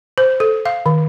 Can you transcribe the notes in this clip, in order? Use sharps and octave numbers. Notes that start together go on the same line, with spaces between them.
C5
A4
F5
D#3